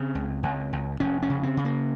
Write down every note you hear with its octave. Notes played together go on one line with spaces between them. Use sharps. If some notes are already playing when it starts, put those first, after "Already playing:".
Already playing: C#3 C4
C#2
C#2
C#2
F1 C#4
C#4
C#3
C4
C#3
A#3